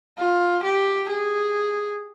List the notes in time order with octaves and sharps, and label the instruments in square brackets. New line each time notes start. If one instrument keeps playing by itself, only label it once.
[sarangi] F4
G4
G#4